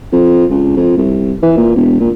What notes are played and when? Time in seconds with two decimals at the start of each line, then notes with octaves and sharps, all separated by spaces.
0.12 F2
0.50 C#2
0.77 F2
0.98 C2
1.42 E3
1.57 A#2
1.75 E1
2.00 A#2